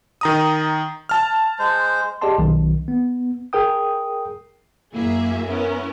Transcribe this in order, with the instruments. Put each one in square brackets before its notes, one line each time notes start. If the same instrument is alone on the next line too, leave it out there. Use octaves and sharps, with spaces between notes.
[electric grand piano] D#3 A#5 D#6
A5 F6
[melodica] G#3 C5
[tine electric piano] G4 G#4 D5 D#5 A5 C6
B1 D#3
B3
G#4 A#4 G5 D#6
[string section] F#2 A#3 E4 F#4 G#4 E5
B3 C#4 E4 A#4